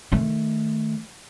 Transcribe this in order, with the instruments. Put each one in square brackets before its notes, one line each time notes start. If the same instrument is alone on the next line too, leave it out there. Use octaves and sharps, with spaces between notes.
[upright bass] D#3 A3